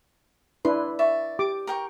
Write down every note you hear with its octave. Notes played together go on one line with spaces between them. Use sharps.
D4 E4 B4 C6
D5 E5 C#6
G4 D6
A#4 G5 C#6